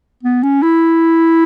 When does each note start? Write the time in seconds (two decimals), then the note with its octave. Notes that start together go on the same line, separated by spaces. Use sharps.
0.23 B3
0.43 C#4
0.62 E4